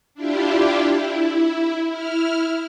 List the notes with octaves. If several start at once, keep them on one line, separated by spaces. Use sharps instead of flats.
D4 E4 F4 G4
E4
E4 F6